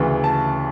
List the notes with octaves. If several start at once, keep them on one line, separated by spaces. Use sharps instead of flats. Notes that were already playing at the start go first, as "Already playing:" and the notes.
Already playing: D2 C#3 E3
A5